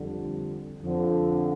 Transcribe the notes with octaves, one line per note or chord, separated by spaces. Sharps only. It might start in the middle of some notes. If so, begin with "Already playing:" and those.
Already playing: F2 D3 G3
F2 D3 F3 C4